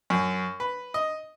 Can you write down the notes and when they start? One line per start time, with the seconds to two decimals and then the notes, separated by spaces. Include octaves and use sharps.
0.10 F#2
0.60 B4
0.94 D#5